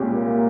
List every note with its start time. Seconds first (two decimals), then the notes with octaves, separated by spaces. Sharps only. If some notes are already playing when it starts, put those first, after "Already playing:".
Already playing: C2 A#2 G#3 C#4 G4
0.14 A#3